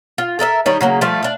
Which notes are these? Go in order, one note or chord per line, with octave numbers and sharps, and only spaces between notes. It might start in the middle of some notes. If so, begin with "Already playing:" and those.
F4
A4 A#4 D#5 E5
D#3 G3 D#4 C#5
C#3 F#3 A#3
F3 G3 A3 F5
D4 F5